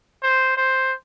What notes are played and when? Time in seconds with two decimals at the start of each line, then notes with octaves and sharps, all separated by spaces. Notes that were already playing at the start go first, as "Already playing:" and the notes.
0.23 C5
0.57 C5